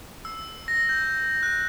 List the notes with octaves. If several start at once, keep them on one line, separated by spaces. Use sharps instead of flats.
E6
A#6
G6
F#6